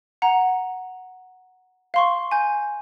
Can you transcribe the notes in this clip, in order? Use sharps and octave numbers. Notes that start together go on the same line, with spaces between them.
F#5 A#5
F5 C6 C#6
G#5 G6